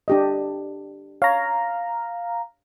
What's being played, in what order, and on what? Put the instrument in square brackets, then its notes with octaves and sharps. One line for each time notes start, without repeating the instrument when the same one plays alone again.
[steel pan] D4 G4 D#5
[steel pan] C#5 [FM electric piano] F5 A#5